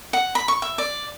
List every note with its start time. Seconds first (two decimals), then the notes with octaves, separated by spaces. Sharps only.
0.13 F#5
0.35 B5
0.48 C#6
0.62 E5
0.78 D5